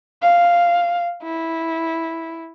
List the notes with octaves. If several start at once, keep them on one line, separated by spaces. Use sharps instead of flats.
F5
E4